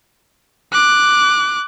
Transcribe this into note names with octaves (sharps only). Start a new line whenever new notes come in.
D6 F#6